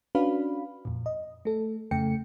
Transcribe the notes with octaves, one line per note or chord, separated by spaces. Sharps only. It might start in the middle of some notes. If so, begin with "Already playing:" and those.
C#4 D4 F#4 B4 F5 B5
F2 A#2
D#5
A3 A4
F2 C#3 A3 A4 G5 C#7